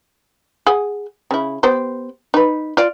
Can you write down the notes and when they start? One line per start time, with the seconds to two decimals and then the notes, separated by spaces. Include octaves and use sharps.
0.67 G#4 F#5 G#5
1.31 C#3 E4
1.63 B3 G4 C5
2.34 D#4 B4
2.77 F4 D5